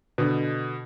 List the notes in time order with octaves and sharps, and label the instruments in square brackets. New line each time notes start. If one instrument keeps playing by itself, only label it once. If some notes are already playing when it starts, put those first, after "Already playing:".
[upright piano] B2 D3